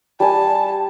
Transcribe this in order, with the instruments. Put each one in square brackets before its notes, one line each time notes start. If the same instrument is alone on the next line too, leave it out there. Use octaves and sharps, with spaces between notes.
[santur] G3 G#5 [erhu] A5